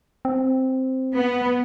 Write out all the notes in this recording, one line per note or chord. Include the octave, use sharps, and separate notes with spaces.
C4
B3